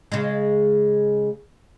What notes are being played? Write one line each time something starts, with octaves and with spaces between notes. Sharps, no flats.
C#3 G#3